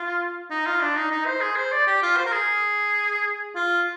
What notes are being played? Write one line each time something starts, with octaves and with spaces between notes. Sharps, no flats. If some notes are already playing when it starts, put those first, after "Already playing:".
Already playing: F4
D#4
F4
D4
D#4
D#4
C5
G#4
C5
D5
G4
F4
C5
A#4
G#4
F4